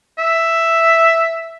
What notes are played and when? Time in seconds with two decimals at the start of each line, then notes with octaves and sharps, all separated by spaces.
0.19 E5